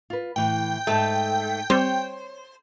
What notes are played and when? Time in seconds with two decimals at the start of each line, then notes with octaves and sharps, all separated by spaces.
0.10 F4 B4
0.36 A2 E3 G5
0.87 G#2 A3 C5 A5
1.70 G3 C4 C5 C#5